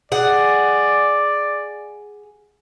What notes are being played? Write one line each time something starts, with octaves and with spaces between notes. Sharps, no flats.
G#4 D5 F#5